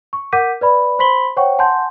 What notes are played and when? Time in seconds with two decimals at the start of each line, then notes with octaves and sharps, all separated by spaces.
0.13 C#6
0.32 A#4 F#5 D6 G6 B6 D#7
0.61 B4 D5 B5
0.99 C5 B5 C6 B6 F#7 G7
1.37 C5 C#5 F#5 G5 C#6
1.58 F#5 G#5 A5 C6 G6